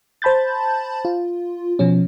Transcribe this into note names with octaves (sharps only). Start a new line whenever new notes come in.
C5 A5 B5 G6 A6
F4
B2 F3 C#4